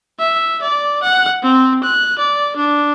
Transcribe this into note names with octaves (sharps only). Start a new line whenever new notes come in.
E5
D5
F#5
C4
F#6
D5
D4